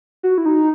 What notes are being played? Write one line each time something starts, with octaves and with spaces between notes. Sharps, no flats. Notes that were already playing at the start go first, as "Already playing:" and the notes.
F#4
E4
D#4